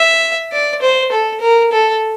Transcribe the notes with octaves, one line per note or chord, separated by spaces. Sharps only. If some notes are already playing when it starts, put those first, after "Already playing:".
Already playing: E5
D5
C5
A4
A#4
A4